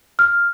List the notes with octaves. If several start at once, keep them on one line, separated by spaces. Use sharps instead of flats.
F6